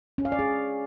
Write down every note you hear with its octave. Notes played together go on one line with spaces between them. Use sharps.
C#4
F5
D5
G#4